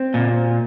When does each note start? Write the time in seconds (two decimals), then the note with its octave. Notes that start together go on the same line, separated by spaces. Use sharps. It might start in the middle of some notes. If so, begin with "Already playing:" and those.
Already playing: C4
0.14 A#2